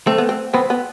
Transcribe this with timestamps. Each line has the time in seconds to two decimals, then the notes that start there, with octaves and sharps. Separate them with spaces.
0.07 A3 C4
0.18 B3
0.29 C4
0.54 B3 C4
0.70 B3